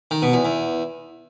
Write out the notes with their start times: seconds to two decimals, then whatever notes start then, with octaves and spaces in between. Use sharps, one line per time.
0.11 D#3
0.22 B2
0.33 E2
0.45 E2